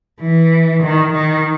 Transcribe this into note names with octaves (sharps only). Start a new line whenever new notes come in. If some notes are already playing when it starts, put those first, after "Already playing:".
E3
D#3
D#3